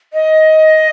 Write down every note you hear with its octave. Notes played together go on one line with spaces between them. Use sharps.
D#5